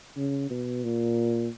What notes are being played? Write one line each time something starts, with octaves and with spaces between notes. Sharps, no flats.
C#3
B2
A#2